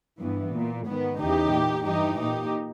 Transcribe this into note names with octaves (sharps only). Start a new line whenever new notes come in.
G2 E3 B3
A#2
G#2 D#3 B3
E2 C#3 E3 D#4 G4
A#2
G2 E3 D#4 G4
A#2 D#4 G4